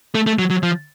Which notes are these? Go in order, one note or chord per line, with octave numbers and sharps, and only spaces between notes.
A3
A3
F#3
F#3
F3